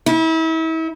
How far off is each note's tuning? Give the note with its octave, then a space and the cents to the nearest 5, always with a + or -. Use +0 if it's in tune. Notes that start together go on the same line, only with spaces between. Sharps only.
E4 -35